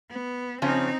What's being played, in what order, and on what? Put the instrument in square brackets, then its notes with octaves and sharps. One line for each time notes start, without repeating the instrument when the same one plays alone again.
[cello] B3
[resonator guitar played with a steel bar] C#3 F3 C#4 [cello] C4 D#4